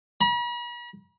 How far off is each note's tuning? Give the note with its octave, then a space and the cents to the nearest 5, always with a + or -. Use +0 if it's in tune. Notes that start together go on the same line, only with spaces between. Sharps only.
B5 -45